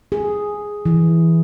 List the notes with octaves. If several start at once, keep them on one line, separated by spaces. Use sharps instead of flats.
G#4
E3